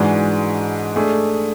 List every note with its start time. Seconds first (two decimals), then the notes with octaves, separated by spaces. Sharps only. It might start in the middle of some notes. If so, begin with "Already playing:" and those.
Already playing: G#2 E3 G#3 D4 F#4
0.96 A3 D4 G#4